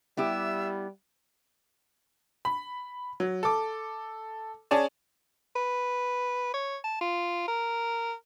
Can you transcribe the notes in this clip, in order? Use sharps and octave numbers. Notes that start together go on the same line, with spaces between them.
G3 B3 E4 G4 E5
B5
F#3
A4 D6
C#4 G#4 D5 A5
B4
C#5
A5
F4
A#4